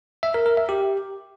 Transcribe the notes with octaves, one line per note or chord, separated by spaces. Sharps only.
E5
A#4
A#4
E5
G4